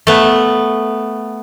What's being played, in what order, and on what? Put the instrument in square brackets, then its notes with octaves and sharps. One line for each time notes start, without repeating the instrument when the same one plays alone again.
[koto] A3 B3